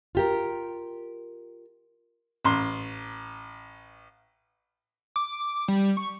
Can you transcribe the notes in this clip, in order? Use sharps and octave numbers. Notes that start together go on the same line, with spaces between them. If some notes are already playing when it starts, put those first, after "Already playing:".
F4 G4 A#4
A1 C6
D6
G3
C#6